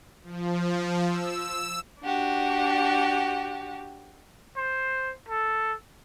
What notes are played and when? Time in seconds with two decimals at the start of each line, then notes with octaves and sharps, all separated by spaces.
0.23 F3
1.05 E6
2.00 D4 F#4 G4
4.57 C5
5.29 A4